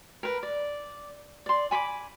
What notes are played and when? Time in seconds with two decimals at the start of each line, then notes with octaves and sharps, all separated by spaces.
0.23 A#4 B4
0.43 D5
1.46 D5 C6
1.71 G#5 B5 C#6 D6